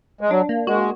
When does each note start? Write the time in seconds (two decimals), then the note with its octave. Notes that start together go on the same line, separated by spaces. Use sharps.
0.21 G#3
0.30 F#3 D4
0.49 A#3
0.67 G#3 F#4